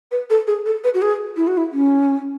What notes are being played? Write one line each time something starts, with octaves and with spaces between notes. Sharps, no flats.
B4
A4
G#4
A4
B4
F#4
G#4
E4
F#4
E4
C#4